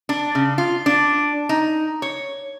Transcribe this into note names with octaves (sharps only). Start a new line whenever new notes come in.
D4
C#3
F4
D4
D#4
C#5